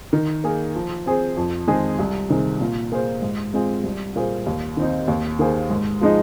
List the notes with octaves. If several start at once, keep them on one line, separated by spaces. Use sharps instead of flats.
D#3
A#3 G#4
F3
C4 G#4 C5
F2
D#3 G#3 C4 G#4
C2
C3 D#3 C4 G#4
A#2
A#3 G#4 C5
G#2
G#3 C4 F4 G#4
C2
A#2 A#3 G#4 C5
D#2
D#3 C4 D#4
D#2
D#3 A#3 G#4 C5
G#2
F3 G#3 D#4